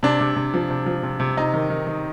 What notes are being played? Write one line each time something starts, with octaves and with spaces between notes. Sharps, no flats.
C3 D4
C3
C3
F3
C3
F3
C3
C3
C3 D#4
D#3
D#3
D#3